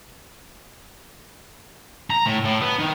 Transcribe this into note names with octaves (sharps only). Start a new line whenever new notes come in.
A#5
A2
A2
B3
D#3